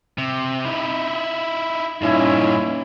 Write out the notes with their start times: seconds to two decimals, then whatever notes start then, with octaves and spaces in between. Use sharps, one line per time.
0.18 C3
0.65 D#4 E4
2.02 G2 A#2 C#4 D#4 E4